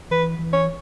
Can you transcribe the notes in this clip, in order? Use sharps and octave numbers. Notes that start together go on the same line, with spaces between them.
E3 B4
E3
C#5